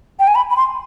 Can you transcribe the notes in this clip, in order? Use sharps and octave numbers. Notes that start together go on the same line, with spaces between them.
G5
G#5
B5
B5
C6